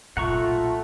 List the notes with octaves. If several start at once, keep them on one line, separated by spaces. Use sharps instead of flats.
B1 A#2 A3 F4 F#5 A#5 C#6